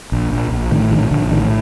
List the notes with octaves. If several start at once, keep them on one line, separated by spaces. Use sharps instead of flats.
A#1
A#1
A#1
A2 D#3
A#1 D#3
A#1 D3
A2 D#3